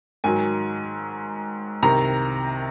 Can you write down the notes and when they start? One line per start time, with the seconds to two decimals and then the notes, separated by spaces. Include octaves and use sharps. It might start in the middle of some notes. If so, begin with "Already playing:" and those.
0.24 G#2 D#3 F#3 G#5
1.83 C2 C3 D#3 A#5